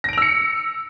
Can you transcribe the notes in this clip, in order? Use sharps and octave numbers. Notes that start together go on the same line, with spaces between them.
E6 A#6 C#7 D7 F7